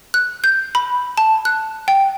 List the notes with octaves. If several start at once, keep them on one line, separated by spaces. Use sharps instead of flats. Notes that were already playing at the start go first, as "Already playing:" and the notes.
F#6
G6
B5
A5
F#6
G5